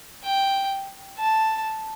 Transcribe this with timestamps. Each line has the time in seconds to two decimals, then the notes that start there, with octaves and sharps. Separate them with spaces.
0.24 G5
1.19 A5